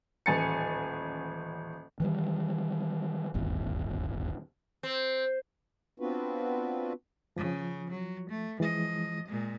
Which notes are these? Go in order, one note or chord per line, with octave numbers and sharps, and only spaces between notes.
D#1 A1 G#5 A6 C#7
D#3 E3 G3
D1 G1 D#2
C4
B3 C4 D4 F4 F#4 B4
C#3 F3
F#3
A3
E3 F3 G#3 D#5
A#2 G#3